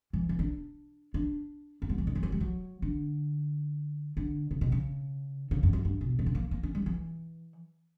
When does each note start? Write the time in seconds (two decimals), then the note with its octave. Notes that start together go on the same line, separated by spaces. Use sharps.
0.13 E3
0.29 E3
0.39 D4
1.14 D4
1.82 B3
1.89 G3
1.98 E3
2.07 D3
2.15 E3
2.23 F#3
2.32 G3
2.40 F#3
2.82 D3
4.17 D3
4.51 C#3
4.61 B2
4.72 C#3
5.51 C#3
5.63 F#2
5.73 F#2
5.85 G2
6.01 B2
6.19 B2
6.26 C#3
6.35 A#3
6.51 A#3
6.63 C#4
6.75 G3
6.86 E3